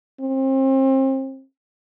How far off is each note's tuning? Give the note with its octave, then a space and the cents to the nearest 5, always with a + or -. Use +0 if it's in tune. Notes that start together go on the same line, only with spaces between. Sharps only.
C4 +35